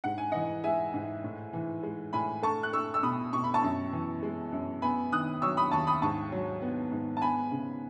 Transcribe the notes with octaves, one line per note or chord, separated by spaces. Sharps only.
G#2 F#5
G#5
E3 D#5 F#5
G#3 E5 G#5
G#2
A2
E3
G#3
A2 G#5 B5
A3 A5 C#6
F#6
A3 C#6 E6
E6
B2 B5 D#6
B2 C#6
B5
A5 C#6
F#2
E3
G#3
F#2
B3 G#5 B5
D#3 D#6 F#6
F#3 C#6 E6
B5 D#6
D#2 A5 C#6
B5 D#6
G#2 A5 C#6
F#3
B3
G#2
A5
B3 G#5 B5
C#3